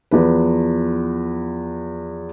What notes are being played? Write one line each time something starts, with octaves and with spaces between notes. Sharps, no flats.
E2 F3 B4